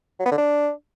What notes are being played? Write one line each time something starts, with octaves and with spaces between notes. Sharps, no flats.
F#3
B3
D3
D4